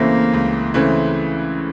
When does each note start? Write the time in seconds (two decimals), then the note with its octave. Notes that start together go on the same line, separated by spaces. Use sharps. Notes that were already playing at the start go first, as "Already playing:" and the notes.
Already playing: C#2 C#3 E3 A3 A#3 C4
0.33 C#2
0.74 C#3 E3 A3 C4